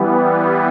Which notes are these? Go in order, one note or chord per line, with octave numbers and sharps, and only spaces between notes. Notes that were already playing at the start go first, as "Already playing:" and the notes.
Already playing: E3 G3 B3